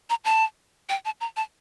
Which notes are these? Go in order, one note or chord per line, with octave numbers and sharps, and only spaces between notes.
A#5
A5
G5
A5
A#5
A5